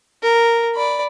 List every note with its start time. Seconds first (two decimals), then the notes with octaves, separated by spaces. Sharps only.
0.23 A#4
0.75 D5 B5